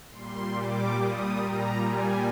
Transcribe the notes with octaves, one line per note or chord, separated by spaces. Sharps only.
A#2 G3 C6
D6
D#6
A#5
A#2 G3 G#5